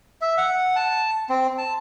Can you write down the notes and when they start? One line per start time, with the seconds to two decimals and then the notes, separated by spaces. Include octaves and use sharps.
0.21 E5
0.38 F#5
0.76 A5
1.29 C4
1.58 A5